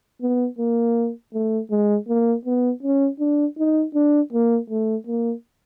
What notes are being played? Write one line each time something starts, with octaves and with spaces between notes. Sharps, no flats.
B3
A#3
A3
G#3
A#3
B3
C#4
D4
D#4
D4
A#3
A3
A#3